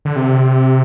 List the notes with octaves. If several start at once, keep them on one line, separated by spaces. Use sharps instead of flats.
D3
C3